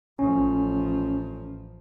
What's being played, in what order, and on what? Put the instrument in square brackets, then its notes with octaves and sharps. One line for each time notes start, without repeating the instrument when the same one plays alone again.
[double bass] A1 F3 [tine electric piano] C#4